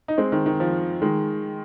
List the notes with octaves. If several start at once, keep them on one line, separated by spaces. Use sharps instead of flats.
D#4
G#3 C4
D#3
D#3
F3
D#3 G#3